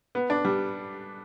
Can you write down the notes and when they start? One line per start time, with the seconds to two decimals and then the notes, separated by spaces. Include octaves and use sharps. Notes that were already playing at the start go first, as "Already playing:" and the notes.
0.15 B3
0.30 D4
0.45 G3